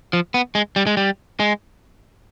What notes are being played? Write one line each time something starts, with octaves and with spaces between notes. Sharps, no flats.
F3
B3
G#3
G3
G#3
G3
G#3